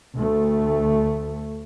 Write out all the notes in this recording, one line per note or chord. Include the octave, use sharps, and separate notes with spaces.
D2 A3